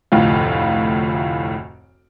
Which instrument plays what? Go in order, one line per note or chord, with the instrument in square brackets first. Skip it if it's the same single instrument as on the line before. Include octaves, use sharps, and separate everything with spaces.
[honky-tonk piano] F1 D2 A2 F4